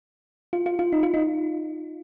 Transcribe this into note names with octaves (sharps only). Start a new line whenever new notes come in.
F4
F4
F4
D#4
F4
D#4